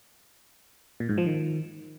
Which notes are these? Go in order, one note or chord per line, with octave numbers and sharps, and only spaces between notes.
A#2
G#2
F3
D#3